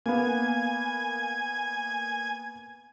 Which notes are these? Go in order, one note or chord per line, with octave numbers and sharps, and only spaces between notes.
A#3 B3 G#5